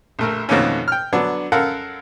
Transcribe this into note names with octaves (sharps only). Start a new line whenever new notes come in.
A#1 A3 A#4
F2 B2 D#3 A3 A#3 C#4
G5 F6
D3 F#3 B3 D4
F#2 A4 A#4 F5 F#5